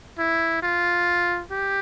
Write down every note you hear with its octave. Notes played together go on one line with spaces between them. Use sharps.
E4
F4
G4